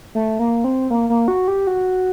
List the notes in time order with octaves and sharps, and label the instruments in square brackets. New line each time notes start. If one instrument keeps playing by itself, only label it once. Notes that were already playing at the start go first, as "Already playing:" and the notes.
[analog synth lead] A3
A#3
C4
A#3
A#3
F#4
G4
F#4